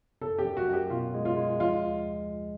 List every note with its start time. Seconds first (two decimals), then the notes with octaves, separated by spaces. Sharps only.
0.21 F#2 A4
0.39 G4
0.45 F#2
0.57 F#4
0.68 F#2
0.73 G4
0.90 B2 F4
1.14 G#3
1.25 F4
1.37 G#3
1.60 F3 F4
1.83 D#2